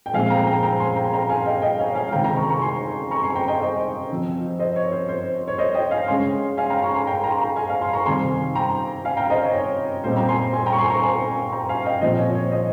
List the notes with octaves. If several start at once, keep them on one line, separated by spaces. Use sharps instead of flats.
G5
A#2 F3 G#3 C4 F5 G#5
G5 A#5
G5 A#5
G5 A#5
G#5 C6
G5 A#5
G5 A#5
F5 G#5
D#5 G5
D#5 G5
C#5 F5
F5 G#5
C3 D#3 G#3 G5 A#5
G5 A#5
A#5 C#6
A#5 C#6
G#5 C6
A#5 C#6
G#5 C6
G5 A#5
D#5 G5
C5 D#5
F3 C4
C5 D#5
C#5
C5
C5
C#5
C5 D#5
D#5 G5
F5 G#5
C#3 G#3 C#4 G#5 C6
F5 G#5
G5 A#5
A#5 C#6
G#5 C6
G5 A#5
G5 A#5
C6
G5 A#5
F5 G#5
F5 G#5
G#5 C6
A#5 C#6
C3 D#3 G3 C4 G#5 C6
G5 A#5
F5 G#5
G5 A#5
F5
C5 D#5
C#5
C#5
A#2 G3 C4 C5
G5 A#5
G#5 C6
G#5 C6
G5 A#5
C#6
G#5 C6
A#5 C#6
G#5 C6
G5 A#5
F5 G#5
D#5 G5
A#2 F3 C4 C5 D#5
C#5
C#5
C5 D#5